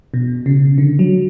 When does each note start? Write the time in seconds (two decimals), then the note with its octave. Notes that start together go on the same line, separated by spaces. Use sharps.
0.14 B2
0.46 C#3
0.78 D3
0.99 F#3